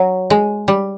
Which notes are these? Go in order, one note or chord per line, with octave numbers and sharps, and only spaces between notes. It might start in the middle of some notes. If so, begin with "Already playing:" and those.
Already playing: F#3
G#3
G3